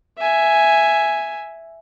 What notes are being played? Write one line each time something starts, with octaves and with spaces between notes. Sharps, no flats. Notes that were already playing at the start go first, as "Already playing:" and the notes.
E5 G#5